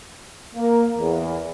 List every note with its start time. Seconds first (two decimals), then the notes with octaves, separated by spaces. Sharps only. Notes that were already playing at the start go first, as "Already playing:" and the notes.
0.56 A#3
0.97 E2